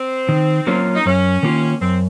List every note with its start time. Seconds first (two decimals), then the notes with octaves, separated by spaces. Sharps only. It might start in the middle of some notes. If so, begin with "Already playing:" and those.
Already playing: C4
0.29 D#3
0.67 F#3 A#3 C#4 F4
0.95 D#4
1.06 F#2 C#4
1.43 D#3 A#3 F4
1.81 F#2 C4